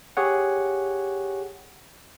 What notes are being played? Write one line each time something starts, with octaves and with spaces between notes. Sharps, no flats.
G4 G#4 C#5 F#5